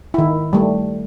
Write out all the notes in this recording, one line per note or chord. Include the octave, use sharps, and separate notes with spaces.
D#3 E4
G3 A3